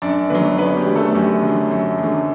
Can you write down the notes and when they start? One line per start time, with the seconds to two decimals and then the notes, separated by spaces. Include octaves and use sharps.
0.02 F#2 D4 D5
0.30 D3 F#3 B3 B4
0.58 F#2 B3 B4
0.77 G4
0.87 D3 F#3
0.96 A3 A4
1.14 F#2 G4
1.43 D3 F#3
1.71 F#2
1.98 D3 F#3